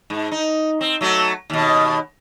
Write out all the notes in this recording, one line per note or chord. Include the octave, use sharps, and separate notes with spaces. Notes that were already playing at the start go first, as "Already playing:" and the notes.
G#2
D#4
C4
F#3 A3 F#4
D#2 B2